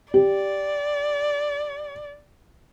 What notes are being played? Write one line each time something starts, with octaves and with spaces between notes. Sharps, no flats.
G4 D5